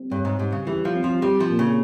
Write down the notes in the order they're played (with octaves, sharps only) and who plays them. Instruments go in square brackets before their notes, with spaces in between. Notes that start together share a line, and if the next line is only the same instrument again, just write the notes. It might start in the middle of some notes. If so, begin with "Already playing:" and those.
Already playing: [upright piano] G3 C4
[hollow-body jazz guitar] G2 [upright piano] C#5
[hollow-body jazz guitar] G#2
[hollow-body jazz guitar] G#2 [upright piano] G3
[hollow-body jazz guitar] C#3
[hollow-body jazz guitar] E3 [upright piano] G4
[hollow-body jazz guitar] F3
[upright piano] C4
[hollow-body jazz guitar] F3
[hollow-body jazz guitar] G3 [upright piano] G4
[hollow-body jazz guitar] F3
[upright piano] A#2
[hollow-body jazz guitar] C#3